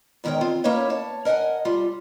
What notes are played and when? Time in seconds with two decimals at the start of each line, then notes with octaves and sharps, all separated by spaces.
0.24 E2 G#2 D#3 A#4 C#5 G5
0.41 C4 F4
0.64 A#3 C#4 E4 B4 C#5 D#5
0.90 C#5 A5
1.25 A#4 D#5 E5 F#5 G#5
1.65 G3 F4